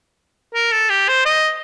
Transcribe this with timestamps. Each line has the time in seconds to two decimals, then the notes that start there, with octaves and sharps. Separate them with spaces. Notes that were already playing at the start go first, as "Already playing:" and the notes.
0.54 A#4
0.72 A4
0.90 G4
1.08 C5
1.26 D#5